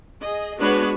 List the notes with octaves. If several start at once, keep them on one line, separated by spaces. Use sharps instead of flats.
G#4 D#5
G#3 B3 D4 F#4 B4 C#5